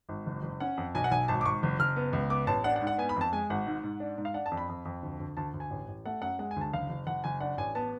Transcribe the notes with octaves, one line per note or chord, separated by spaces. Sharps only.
G#1
F#1
F#1
C#4 F#5
F2
B1 G#5
F#5
B1 G#5
G#1 A5
D6
G#1 C#6
F#1
F#1 F6
B3
C#2
B3 D6
A1 A5
D4 F#5
F#5
G#2
F#5
B3 G#5
B5
F2 A5
G#3 G#5
G#1 F#5
G#2
G#2
D4
G#2
F5
D4 F#5
A5
F2
B5
F2
F2
D2
D2
D2 A5
D2
G#5
A1
A1
A3 F#5
F#2 F#5
G#3 F#5
G#5
D2 A5
F#1 F5
F#1
F#1 F#5
F#1 G#5
D4 F#5
A1 G#5
B3 A5